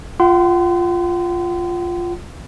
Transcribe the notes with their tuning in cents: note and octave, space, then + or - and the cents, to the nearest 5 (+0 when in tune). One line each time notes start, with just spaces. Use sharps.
F4 +0 F#5 +45 C6 -30